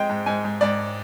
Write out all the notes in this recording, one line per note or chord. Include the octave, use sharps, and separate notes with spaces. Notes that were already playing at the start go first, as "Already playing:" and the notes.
Already playing: F2 G#3 G5
G#2
G#2 G#5
G#2
G#2 D5